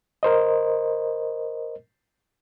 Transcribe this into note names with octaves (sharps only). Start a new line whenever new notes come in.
A#4 C5 D#5